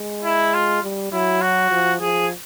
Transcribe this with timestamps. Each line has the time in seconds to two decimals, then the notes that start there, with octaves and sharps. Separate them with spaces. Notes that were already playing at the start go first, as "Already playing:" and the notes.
Already playing: G#3
0.24 E4
0.54 F4
0.83 G3
1.12 F#3 E4
1.41 F#4
1.71 F3
2.00 F3 G#4